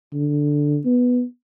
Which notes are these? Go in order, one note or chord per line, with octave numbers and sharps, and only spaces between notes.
D3
B3